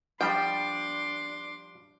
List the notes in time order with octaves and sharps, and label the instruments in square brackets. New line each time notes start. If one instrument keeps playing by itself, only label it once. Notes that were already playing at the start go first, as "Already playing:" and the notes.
[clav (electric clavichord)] F3 G3 [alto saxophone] D4 [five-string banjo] G5 [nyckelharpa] C6 D6